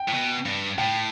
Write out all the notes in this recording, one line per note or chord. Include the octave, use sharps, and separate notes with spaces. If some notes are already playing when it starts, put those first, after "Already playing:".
Already playing: G5
A2
B2
G2
A2 G5